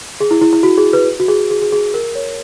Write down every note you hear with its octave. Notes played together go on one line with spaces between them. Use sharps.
G#4
E4
E4
E4
F#4
G#4
B4
F#4
G#4
G#4
G#4
G#4
A#4
C#5